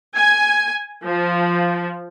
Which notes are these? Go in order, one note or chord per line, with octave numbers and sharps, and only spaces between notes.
G#5
F3